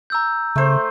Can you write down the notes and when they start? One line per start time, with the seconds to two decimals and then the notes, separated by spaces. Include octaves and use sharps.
0.10 A#5 E6 G6
0.56 C#3 A3 C5